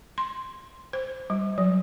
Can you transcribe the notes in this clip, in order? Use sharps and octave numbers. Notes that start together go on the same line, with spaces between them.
C6
C5
G3
F#3